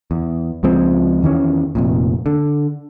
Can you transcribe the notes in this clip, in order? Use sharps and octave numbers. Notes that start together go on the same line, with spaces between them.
E2
C#2 F3 G#3 C4
E2 D#3 E3 C#4
F1 F2 A#2
D3